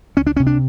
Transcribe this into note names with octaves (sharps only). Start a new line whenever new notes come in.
C#2 C#4
D4
C3 C#4
D4